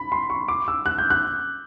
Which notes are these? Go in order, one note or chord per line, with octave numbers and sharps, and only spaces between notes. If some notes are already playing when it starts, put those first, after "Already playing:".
Already playing: B5
C6
C#6
D6
E6
F#6
G6
F#6